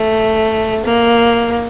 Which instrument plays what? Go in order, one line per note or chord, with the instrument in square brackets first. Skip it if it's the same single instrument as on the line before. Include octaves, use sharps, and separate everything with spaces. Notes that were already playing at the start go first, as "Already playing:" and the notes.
Already playing: [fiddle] A3
A#3